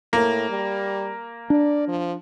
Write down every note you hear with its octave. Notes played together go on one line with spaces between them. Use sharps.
A2 A#3
G3
D4 D5
F3